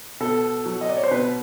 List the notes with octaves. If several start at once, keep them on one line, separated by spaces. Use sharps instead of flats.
B2 A4
F#3
D#5
D5
C#5
C5
B2 B4